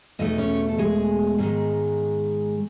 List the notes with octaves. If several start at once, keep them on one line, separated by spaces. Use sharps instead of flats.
E2 B2 A3 D#4 D#5
C#4 C#5
A4
G#3 G#4
G#2 D#3 G#3